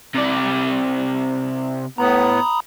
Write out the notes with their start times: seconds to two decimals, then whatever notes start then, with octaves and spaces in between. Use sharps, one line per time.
0.15 C3 D5
1.98 A2 B3 A#5 B5 D#6